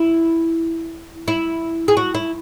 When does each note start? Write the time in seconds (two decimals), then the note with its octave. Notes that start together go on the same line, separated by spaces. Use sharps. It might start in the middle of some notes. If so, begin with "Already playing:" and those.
Already playing: E4
1.28 E4
1.88 G#4
1.97 F#4
2.14 E4